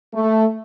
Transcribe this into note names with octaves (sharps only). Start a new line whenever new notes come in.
A3